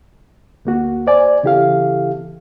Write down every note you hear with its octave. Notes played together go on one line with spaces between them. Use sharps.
D2 A#3 F#4
C5 D5 G#5
C#3 E3 E4 G4 A4 F5